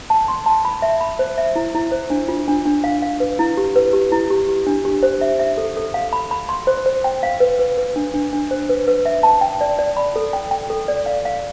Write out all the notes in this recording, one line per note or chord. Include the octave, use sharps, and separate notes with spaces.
A5
C6
A5
B5
E5
B5
C5
E5
E4
E4
C5
D4
F4
D4
D4
F5
F5
B4
E4
G4
B4
G4
E4
G4
G4
D4
G4
C5
E5
E5
A4
A4
F5
B5
B5
C6
C5
C5
G5
F5
B4
B4
B4
D4
D4
D4
C5
B4
B4
E5
A5
G5
D5
D5
B5
A4
G5
G5
A4
D5
F5
F5